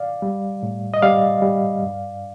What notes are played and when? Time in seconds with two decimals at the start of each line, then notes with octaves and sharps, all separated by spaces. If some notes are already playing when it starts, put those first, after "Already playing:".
Already playing: D5 F5
0.22 G3
0.63 A2
0.94 D#5
1.02 G3 D5 F5
1.42 G3
1.83 G2